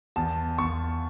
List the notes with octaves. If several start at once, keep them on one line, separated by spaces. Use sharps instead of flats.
E2 A5
E2 C#6